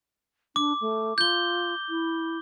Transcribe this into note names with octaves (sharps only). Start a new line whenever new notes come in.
D4 D6
A3
F4 G6 G7
E4